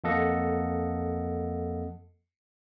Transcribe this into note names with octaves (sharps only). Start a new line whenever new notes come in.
F2 A#3 A4 D#5 F#5